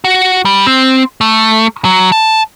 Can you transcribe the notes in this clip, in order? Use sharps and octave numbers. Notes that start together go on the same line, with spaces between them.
F#4
G3
C4
A3
F#3
A5